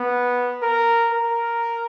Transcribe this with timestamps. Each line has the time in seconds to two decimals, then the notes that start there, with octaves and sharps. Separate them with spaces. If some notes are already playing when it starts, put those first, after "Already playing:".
Already playing: B3
0.63 A#4
1.12 A#4